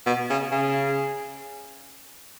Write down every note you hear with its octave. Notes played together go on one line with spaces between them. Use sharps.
B2
C#3
C#3